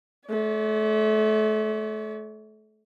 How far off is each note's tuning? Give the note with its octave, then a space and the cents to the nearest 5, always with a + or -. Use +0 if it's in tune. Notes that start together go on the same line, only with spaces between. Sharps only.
A3 -30 C#5 +40